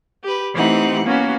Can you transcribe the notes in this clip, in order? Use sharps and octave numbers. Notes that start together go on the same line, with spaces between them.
G4 B4
E3 A3 C4 D#4 G4 F#5
A#3 B3 C#4 F#4